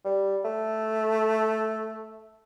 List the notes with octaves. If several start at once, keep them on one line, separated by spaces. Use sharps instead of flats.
G3
A3